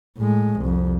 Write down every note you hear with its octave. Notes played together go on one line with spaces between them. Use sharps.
A2 G#3
C2 F2